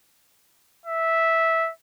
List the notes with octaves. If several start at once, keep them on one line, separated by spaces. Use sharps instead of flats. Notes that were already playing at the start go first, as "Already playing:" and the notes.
E5